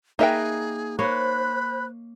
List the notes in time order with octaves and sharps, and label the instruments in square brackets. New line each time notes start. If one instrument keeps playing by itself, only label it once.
[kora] A#3 A#4 B4 [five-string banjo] D#4 E5 G5 [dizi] G#4
[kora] A#3 C#5 D#5 [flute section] C5 F#6 [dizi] B5